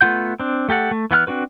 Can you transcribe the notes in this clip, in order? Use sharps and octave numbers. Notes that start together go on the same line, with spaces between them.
A3 B3 F4 F#5 G6
C4 D4
A3 G4 A4 F#5
A3
E3 B3 F#5 F6 F#6
C4 D4 F#4 B4